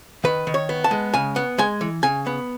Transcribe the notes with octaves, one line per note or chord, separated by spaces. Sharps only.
D#3 B4
D#3
C#5
B3
A5
G#3
C#3 G#5
B3
G#3 G#5
E3
C#3 G#5
B3